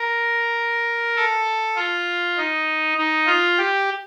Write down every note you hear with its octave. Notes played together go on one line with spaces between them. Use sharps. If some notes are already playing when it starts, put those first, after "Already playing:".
Already playing: A#4
A4
F4
D#4
D#4
F4
G4